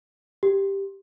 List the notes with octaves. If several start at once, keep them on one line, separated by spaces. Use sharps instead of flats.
G4